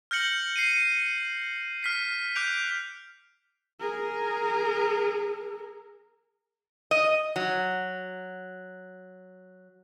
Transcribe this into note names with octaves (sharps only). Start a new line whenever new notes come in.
F6 G6 A#6 C#7 F#7
C7 C#7 D#7
F6 B6 C7
D6 F#6 G6 D7 F7
G#4 A#4
D#5
F#3